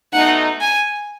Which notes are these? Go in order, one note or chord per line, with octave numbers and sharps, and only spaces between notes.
B2 A3 D#4 F#5
G#5